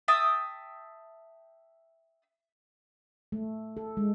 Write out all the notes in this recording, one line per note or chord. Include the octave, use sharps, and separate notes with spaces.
E5 G5 A5 D#6
A3
A4
G#3